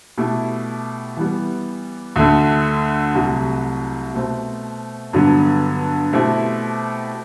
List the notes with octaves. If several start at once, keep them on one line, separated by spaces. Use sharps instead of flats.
B2 A3 E4 G4
E3 G3 B3
D2 D3 A3
C2 C3 F#3 A3
B2 A3 C4
G2 D3 F#3 B3
B2 A3 C4 E4 G4